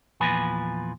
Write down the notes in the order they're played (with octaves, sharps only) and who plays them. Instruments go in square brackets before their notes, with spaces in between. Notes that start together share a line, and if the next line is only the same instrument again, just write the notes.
[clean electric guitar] E2 A#2 F3 B4 G#5